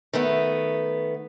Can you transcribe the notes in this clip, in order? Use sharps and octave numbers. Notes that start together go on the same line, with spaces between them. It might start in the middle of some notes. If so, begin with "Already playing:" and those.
D#3 A3 B3